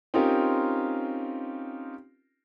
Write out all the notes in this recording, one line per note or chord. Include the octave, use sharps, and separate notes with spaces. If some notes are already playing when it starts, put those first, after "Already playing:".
C4 C#4 D#4 F4 G4 A#4